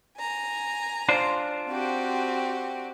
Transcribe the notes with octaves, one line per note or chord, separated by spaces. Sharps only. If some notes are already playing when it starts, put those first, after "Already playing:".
G#5 A#5
D4 F4 C5
C4 F#4 G4